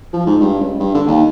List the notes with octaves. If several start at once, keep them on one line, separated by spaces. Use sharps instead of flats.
F3
G#2
G2
C#2
G2
D3
D#2